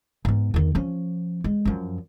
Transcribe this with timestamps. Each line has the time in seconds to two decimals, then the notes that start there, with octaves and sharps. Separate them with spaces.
0.25 G#2 B3
0.54 E2 D#3
0.75 F3 C#4
1.44 G#3
1.65 F#2 F3